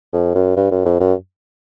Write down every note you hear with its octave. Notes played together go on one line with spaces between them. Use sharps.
F2
F#2
G2
F#2
F2
F#2